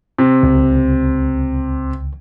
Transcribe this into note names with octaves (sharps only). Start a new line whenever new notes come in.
C3
C#2